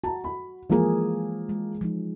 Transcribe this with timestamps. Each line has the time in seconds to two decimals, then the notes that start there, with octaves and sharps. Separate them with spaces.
0.04 F#4 A5 A#5
0.24 B5
0.70 E3 F3 G#3 A#3 G#4
1.49 G#3
1.81 F3 G#3 D#4